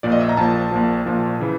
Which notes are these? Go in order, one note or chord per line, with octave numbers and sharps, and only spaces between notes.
A#1 A#2 F3 D5
D#5
E5
A#5
A#1 A#2 F3 A5
A#1 A#2 F3
A#1 A#2 F3
C#3 E3